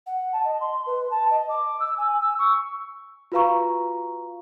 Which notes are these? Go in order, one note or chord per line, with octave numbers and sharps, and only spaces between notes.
F#5
A5
D#5
C6
B4
A5
D#5
D6
E6
G#5
E6
C#6
F4 F#4 B4 F5 A#5 C#6